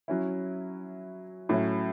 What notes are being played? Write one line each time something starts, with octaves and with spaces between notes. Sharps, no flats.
F#3 C#4 E4
A2 F#3 C#4 E4